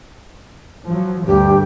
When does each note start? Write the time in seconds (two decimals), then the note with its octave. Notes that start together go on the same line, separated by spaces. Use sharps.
0.87 F3 F#3
1.27 D2 G2 G4